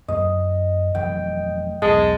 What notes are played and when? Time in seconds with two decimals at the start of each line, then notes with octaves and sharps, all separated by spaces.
0.08 F#2 A#3 D#5
0.95 F1 E3 F#3 G5
1.82 B1 E2 G#2 G#3 A5